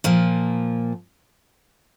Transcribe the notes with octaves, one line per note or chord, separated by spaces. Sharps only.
A#2 F3 A#3